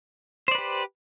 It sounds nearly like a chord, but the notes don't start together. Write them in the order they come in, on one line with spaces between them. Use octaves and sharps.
C5 D5 B4 G4